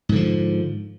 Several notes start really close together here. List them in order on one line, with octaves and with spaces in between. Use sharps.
G#2 D3 F3